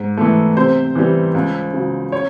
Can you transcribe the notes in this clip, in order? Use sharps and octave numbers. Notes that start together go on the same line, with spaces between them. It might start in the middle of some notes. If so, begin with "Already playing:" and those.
Already playing: G#2
E3 A3
C3 C5
E3 G3
C#2
C#3 F#3
C#5